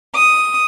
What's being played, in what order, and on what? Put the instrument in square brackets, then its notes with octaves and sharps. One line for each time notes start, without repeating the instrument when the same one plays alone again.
[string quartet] D#6